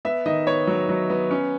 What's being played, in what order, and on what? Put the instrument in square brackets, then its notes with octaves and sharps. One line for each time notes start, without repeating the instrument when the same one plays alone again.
[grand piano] B3 E5
D#3 D#5
B3 C#5
F#3
F#3
B3
C#4